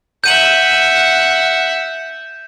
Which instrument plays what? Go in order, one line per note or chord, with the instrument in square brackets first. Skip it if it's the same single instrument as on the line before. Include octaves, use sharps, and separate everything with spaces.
[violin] E5 F#5 [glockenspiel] G6 D#7 F#7